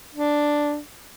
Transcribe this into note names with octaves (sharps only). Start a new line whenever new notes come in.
D4